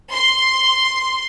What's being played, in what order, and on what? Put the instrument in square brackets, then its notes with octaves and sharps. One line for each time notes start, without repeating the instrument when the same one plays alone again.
[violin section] C6